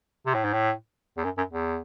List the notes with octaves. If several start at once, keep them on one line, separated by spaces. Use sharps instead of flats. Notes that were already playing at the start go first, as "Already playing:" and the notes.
C3
A2
G#2
A2
E2
F#2
F#2
E2